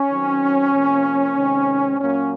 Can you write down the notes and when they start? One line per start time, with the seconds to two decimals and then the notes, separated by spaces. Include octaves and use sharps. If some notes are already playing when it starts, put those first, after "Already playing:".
Already playing: C#4
0.10 D#3 F#3 C4
0.73 C3 F3 A#3
1.35 C3 D#3 G#3 C4
1.98 A#2 F#3 A#3 C#4